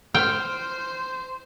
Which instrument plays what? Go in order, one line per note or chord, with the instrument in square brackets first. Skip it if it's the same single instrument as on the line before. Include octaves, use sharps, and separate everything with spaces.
[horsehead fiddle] C5 [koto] G5 [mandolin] F6